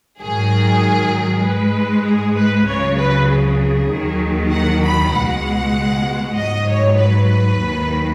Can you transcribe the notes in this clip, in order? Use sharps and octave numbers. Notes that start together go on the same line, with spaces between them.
G#2 D#3 F#3 G#4
G#2 G#3 B4
G#4
B4
C#2 C#3 F#3 C#5
B4
G#4
D#2 D#3 F#3
F#5
B5
C#2 B2 G#3 F#5
G#2 F#3 D#5
C#5
B4
D#2 D#3 F#3